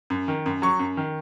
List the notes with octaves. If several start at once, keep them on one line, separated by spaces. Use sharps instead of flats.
F#2
D#3
F#2
F#3 C#6
F#2
D#3